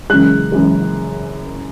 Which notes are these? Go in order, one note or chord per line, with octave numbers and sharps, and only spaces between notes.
F#1 F#2 E3 G#3 F#6
F#1 F#2 E3 G#3